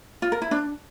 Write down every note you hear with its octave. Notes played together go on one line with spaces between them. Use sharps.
F4
A#4
E4
D4